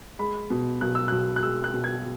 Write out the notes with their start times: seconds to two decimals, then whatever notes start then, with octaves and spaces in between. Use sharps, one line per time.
0.19 G#3 B5
0.50 B2
0.81 B1 F#6
0.95 E6
1.08 B1 F#6
1.36 F#6
1.42 G#3 E6
1.64 F#6
1.74 B2
1.84 G#6